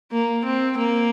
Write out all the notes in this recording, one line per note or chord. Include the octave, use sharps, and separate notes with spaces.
A#3
C4
A#3